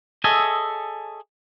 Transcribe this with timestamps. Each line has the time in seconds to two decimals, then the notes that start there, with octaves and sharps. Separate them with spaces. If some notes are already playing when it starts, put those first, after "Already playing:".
0.24 G#4 A4 C#5 D#5 E5 G#5